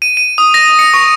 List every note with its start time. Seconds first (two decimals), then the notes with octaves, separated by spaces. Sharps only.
0.02 D#7
0.17 D#7
0.38 D#6
0.54 A#6
0.79 C#7
0.94 C#6